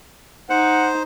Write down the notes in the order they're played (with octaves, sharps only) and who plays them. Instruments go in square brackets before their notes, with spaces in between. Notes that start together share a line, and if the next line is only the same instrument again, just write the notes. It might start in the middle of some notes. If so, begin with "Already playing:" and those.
[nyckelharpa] D#4 [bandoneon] C5 [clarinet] F#5